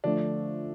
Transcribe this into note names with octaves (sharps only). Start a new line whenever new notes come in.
D3 F3 A3 D4